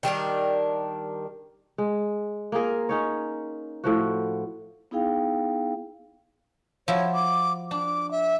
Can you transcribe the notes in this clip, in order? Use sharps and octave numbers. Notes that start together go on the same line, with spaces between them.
D#3 G3 D4 A#4
G#3
A#3 F4 G#4 A#4
C#4 D#4 C#5
A2 F3 F#4
B3 D#4 E4 G#4 F5 G5
F3 E4 F#4 C#5
D6
D4 D6
E5